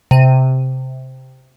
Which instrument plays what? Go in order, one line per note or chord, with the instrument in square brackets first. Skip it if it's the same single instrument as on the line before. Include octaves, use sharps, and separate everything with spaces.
[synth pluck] C3 D#7